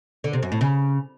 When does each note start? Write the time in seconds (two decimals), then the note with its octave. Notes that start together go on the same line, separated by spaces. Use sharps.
0.24 D3
0.33 C3
0.42 F#2
0.52 A2
0.61 C#3